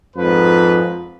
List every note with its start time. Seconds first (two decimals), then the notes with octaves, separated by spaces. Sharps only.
0.16 F2 G#2 F3 B4